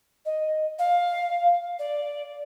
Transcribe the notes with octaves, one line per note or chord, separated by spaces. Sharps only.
D#5
F5
D5